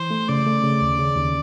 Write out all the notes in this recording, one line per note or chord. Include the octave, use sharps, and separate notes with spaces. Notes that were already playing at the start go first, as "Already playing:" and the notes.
Already playing: E3 C5
A3
C#3 D5
A3
C#3
D#2
C#3
D#2